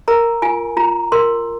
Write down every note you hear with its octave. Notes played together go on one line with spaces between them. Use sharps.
A#4 A#5
F4 G#5
F4 A#5
A#4 C6